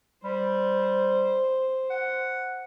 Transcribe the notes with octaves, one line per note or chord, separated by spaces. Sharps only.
G3 C5
F#5